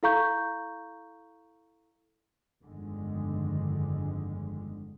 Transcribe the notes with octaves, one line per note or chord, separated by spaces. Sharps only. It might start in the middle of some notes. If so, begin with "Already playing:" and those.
E4 A4 F5 A#5 C#6 G6
G1 F2 D3 D#3 G#3